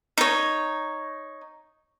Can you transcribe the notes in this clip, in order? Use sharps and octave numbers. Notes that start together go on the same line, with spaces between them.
D#4 C#5